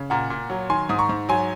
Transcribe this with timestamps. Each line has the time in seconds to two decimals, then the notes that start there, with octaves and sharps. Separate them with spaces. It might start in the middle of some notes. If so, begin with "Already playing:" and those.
Already playing: C#3
0.10 A#2 F#5 A#5
0.30 A#2
0.50 F#3
0.70 D#3 G#5 C6
0.89 G#2 D#6
0.99 A#5 C#6
1.09 G#2
1.29 F#3 G#5 C6